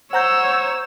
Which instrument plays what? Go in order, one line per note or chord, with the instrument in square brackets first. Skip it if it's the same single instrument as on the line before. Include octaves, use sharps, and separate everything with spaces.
[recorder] C5 [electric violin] C#5 E6 [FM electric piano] F#5 A#5 G6